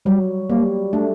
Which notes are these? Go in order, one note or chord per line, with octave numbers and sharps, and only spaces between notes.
F#3 G3
G3 A#3
A3 D4